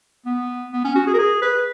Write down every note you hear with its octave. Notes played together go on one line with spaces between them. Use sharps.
B3
B3
C#4
F#4
G#4
A#4
G#4
B4